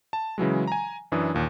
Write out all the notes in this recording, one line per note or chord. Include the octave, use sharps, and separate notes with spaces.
A5
C#3 E3 F#3 G#3
G#5 A#5
F#2 E3 D4 D#6
D#2 A#2